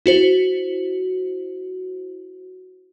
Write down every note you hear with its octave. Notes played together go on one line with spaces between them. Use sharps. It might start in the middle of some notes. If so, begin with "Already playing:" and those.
E4 F#4 C5